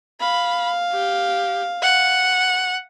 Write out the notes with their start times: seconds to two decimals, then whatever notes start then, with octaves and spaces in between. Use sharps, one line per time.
0.21 F5 B5
0.93 G4
1.82 F#5